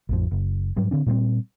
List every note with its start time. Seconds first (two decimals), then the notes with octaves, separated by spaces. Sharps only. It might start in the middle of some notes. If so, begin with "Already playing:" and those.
0.09 A1 F2 F3
0.31 F#1
0.77 G#2 F#3 G3
0.91 D3 C4 D4
1.06 A#2 G3 A#3 C4